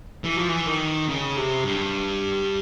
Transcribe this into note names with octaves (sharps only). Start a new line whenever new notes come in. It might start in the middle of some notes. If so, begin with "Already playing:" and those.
E3
F3
E3
D#3
C#3
C3
G2